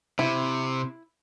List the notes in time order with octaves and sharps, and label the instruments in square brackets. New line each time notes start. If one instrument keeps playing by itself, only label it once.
[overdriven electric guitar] C3 [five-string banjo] E4